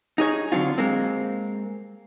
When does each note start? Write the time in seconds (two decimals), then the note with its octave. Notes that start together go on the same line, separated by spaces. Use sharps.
0.18 D#4 G#4 C#5
0.52 D3 F#3 C4 F4
0.78 G#3 A#3 C4